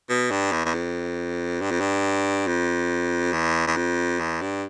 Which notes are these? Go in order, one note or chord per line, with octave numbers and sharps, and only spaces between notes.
B2
G2
E2
E2
F2
G2
F2
G2
F2
E2
E2
F2
E2
G2